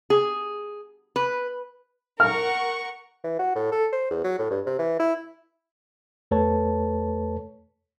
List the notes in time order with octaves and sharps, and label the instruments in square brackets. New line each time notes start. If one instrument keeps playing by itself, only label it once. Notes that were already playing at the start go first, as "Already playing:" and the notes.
[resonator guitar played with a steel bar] G#4
B4
[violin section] A#4 F#5 C#6 [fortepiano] F6
[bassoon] E3
F#4
A2
A4
C5
E2
F#3
A2
G2
C3
E3
E4
[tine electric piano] E2 A3 A4 B4 C#5 A5